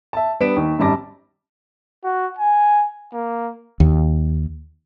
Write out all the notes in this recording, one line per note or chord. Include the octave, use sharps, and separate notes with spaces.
E5 A5
G3 B3 D4 B6 D7 E7
D#2
G#1 F#2 G3 A5 D6 A#6
F#4
G#5
A#3
D#2